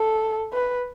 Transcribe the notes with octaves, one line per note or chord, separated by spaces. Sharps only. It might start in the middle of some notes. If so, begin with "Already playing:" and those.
Already playing: A4
B4